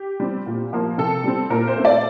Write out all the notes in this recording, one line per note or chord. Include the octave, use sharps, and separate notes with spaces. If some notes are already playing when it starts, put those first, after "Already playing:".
Already playing: G4
G3 C4
A#2
F3 A#3
C3 A4
G3 C4
A#2 A#4
C5
A3 C4
D5